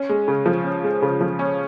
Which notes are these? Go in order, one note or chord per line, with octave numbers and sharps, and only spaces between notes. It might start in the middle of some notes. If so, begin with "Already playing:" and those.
Already playing: C#4
G#3
C#3
F3
C#4
G#3
C#3
F3
C#4